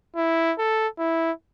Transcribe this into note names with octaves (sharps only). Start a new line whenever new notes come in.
E4
A4
E4